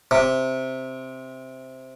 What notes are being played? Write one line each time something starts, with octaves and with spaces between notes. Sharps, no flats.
C3